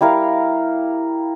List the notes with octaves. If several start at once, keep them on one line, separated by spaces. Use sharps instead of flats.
G3 E4 A#4 F5